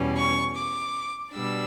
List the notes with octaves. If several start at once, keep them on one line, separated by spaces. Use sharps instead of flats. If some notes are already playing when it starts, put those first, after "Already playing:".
Already playing: E2 B2 G3 C#4
C#6
D6
B2 G3 D4 E6